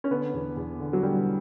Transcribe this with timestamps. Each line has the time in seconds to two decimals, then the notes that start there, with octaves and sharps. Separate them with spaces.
0.04 C#4
0.11 D3 B3
0.34 E2
0.57 E2
0.80 D3
0.93 F#3
1.03 D3 G3